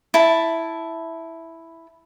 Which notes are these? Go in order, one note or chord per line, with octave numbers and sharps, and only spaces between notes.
E4 A5